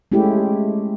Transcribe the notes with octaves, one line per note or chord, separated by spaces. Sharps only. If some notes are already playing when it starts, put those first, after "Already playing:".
G#3 A3 C#4 E4 G4